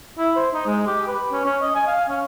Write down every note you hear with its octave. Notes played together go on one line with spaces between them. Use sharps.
E4
C5
D#4
G#3
G4
B4
C#4
C#4
D#5
G#5
F5
C#4